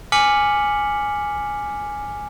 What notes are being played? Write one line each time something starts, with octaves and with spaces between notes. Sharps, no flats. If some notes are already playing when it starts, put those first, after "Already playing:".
G#5 D6 F6 B6 C#7 F#7